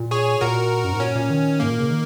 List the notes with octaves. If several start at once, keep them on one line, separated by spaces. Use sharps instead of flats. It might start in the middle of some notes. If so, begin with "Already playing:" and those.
Already playing: A#2
G#4 C#5
A#2 F#4 A#4
F#2
G#2
A#2 C#4
A#2
D#3
G#2 A#3
A#2
C#3
D#3